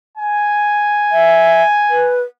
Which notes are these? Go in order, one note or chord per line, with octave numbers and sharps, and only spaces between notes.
G#5
E5
B4